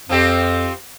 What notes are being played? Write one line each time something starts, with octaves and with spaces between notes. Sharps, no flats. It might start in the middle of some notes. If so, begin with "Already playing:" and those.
F2 F3 C4 G4